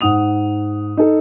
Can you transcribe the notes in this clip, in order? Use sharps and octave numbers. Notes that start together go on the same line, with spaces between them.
G#2 F#5 D#6 F7
D#4 A4